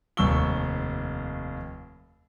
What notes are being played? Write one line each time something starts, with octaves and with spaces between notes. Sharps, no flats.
F1 D#2 C#6 E6 G7